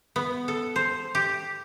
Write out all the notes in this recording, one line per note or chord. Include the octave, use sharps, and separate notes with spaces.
B3
A4
C5
G4